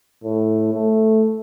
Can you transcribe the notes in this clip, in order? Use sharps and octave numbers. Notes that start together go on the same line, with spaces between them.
A2
A3